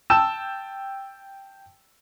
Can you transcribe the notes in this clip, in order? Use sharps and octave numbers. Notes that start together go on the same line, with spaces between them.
G5 A5 E6 E7